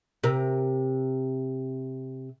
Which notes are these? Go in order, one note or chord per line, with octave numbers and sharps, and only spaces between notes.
C3 A#4